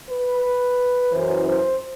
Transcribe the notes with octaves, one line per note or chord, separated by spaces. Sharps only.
B4
F#2 E3 C5
C5